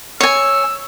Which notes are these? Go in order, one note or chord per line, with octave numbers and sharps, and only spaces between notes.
C#5 G#5 E6